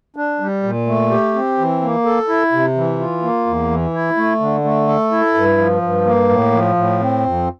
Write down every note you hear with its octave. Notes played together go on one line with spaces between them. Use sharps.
D4
G3
A#2
A3
G4
C4
E3
A#3
A4
E4
C3
E3
F4
A#3
E2
E3
E4
A3
D3
A3
A4
E4
G2
F3
G2
A#3
A2
F3
A2
C4
F2